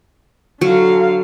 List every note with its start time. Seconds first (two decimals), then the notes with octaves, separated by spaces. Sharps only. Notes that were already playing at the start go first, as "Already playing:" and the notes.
0.61 D3 F#3 F5